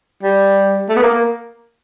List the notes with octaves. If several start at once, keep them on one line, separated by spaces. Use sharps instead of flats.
G3
A3
B3
A#3